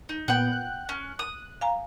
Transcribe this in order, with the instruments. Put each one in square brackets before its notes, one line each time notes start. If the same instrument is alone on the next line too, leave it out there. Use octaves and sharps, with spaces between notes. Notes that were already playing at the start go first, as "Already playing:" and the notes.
[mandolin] D#4
[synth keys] A#2 B3 [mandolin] F#5 G5
[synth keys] F#6
[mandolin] C#4
D#6
[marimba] F5 G#5 A#5